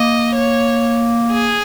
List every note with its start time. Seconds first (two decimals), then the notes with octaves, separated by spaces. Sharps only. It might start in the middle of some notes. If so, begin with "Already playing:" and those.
Already playing: A#3 D#5
0.35 C#5
1.31 G#4